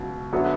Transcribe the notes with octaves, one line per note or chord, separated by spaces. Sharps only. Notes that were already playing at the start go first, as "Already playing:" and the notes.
Already playing: C#2 B2 F#3
D3 F#3 B3 E4